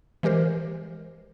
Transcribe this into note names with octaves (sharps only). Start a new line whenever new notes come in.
E3 G#3 G4 A#4 C5